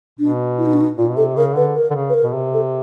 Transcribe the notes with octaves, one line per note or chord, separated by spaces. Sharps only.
B2 D4
E4
D#4
D4
D#4
A#2 F4
B2
C3 A4
C#3 A#4
D3 B4
A#4
D3
C#3
B4
A#4
B2
C3
A4